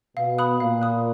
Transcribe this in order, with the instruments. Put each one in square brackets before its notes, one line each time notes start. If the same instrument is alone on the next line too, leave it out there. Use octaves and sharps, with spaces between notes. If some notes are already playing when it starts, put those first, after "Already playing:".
[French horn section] B2 [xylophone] F5
[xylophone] B5 D#6 F#6
[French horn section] A#2 [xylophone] F5
[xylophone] B5 D#6 F#6